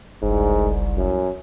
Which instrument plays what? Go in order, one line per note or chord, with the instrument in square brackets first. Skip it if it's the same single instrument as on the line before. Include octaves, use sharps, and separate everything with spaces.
[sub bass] F#1 [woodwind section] C2 [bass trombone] G#2
[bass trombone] F#2